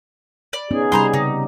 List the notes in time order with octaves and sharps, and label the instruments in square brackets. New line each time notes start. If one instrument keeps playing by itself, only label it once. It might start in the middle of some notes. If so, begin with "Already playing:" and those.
[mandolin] D5
[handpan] B3 C#4 D#4 [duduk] G#4
[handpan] C3 G3 D#4 [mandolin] C5 A#5 C6
[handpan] C#3 [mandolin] D#4